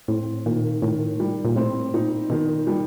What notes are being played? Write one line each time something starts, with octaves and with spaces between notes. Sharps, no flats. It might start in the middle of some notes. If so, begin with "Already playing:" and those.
A2 C4
A#2 D#3
A2 D#3
G3
A#2
A2 C4
A#2 D#4
B2 D#3
G3